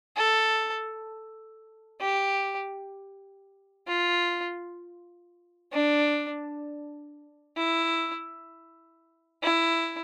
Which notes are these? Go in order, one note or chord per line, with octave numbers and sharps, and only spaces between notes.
A4
G4
F4
D4
E4
E4